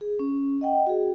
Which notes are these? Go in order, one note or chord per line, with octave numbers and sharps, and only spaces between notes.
G#4
C#4
D#5 F#5 G5
F#4 G#4